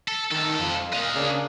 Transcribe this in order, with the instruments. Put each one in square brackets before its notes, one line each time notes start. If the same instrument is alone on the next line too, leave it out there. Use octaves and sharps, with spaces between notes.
[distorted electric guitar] A4
[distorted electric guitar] C2 A4 [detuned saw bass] D#3
[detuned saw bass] F2 [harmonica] F4
[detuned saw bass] A#2 [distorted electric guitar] D#5 F5
[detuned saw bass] C#3 [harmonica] A#3 D4 G#4